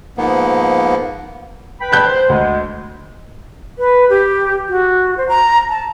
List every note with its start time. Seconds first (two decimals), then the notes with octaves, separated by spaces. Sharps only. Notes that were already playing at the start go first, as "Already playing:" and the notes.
0.18 G#2 F3 A#3 B3
1.80 B4 G5 B5
1.92 A5 F#6 G6
2.06 C5
2.29 D2 G#3
3.79 B4
4.10 G4
4.69 F#4
5.17 C5
5.29 A#5
5.69 A5